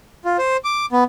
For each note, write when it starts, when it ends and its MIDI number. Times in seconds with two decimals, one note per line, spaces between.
0.25 0.37 65
0.38 0.57 72
0.65 0.86 86
0.92 1.04 59